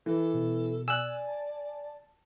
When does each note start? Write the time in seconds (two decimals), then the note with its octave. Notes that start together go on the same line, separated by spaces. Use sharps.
0.06 E3 A4
0.33 B2
0.88 D5 G#5 E6 F#6
1.28 A5